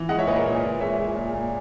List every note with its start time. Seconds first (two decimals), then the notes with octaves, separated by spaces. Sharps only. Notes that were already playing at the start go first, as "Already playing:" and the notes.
Already playing: E3
0.09 G#3 D#5 F#5
0.18 C#5 E5
0.27 A#2 B4 D#5
0.36 A#4 C#5
0.46 A#2
0.64 A#2
0.81 G#3 C#5 E5
0.99 G#3
1.17 A#2
1.34 A#2